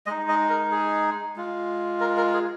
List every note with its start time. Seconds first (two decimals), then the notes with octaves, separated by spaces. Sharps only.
0.06 G#3 D#4 D#5
0.29 D#5
0.50 A#4
0.71 G#4
1.36 G#3 F4
2.01 A#4
2.17 A#4
2.33 G#4